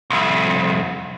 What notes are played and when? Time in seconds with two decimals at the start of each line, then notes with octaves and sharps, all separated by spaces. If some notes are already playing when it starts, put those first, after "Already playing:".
0.10 C2 F2